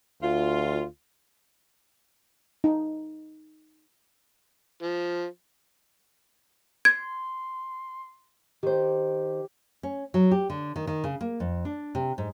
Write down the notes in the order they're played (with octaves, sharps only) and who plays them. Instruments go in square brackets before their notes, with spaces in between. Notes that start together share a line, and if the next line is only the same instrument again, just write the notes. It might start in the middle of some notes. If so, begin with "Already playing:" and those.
[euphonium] D2 [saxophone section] F4
[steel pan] D#4
[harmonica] F3
[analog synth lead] C6 [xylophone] G#6
[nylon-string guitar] D#3 C5 [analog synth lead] G4
[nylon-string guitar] C#4
F#3
G4
D3
D#3
D#3
C#3
A#3
F2
D4
C3
G#2